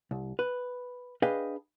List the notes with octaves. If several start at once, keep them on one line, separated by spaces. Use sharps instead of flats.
C2
B4
D4 G#4 B4 D#5 F5 G5